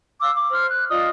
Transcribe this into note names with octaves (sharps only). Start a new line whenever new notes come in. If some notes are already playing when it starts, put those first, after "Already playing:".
F5 D6 E6
D6
C5 F6
F#6
F4 D5 D#5 D#6